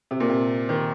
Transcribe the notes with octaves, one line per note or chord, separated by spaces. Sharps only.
C3
A#2
C3
D#3